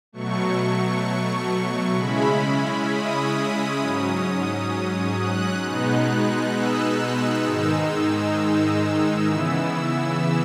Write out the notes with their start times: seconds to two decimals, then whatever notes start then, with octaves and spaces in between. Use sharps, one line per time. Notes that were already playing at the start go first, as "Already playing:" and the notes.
0.12 B2 F#3 A3 C#6
1.95 C#3 G#3 C#4 E4 B5
2.41 B5
2.86 D#6
3.78 G#2 F#3 C#4
5.15 F#6
5.60 B2 G#3 B3 D#4
6.53 E6
7.43 G#2 D#3 G#3 D#4
9.26 C#3 E3 B3 E4